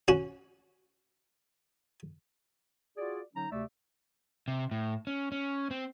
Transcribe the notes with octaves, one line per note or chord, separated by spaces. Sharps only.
C#4 F#4
F4 F#4 G#4 D5
D3 F#3 C#4 D#4 A#5
D2 C3 A3 D5 E5
C3
A2
C#4
C#4
C4